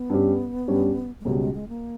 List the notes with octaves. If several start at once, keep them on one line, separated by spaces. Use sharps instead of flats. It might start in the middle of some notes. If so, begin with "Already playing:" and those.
Already playing: B3
G2 G3 C#4 G4
G2 G3 C#4 G4
G#3
C#2 B2 G3 A#3 C#4
G#3
G#3
A#3